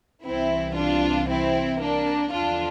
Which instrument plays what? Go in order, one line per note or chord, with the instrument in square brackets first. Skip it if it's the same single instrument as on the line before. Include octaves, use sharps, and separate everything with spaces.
[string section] C2 C3 E3 C4 E4
D4 F4
C4 E4
A#3 D4
E2 D3 F3 D4 F4